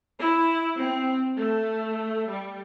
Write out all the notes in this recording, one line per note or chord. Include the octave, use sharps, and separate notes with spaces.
E4
C4
A3
G3